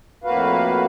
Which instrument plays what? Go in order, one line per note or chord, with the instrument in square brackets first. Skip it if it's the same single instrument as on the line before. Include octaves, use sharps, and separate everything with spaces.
[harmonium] F2 A2 A#3 F#4 B4 F5